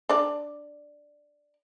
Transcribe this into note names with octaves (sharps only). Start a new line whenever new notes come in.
D4 D5